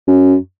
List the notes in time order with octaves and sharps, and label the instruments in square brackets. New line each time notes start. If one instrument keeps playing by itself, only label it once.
[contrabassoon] F#2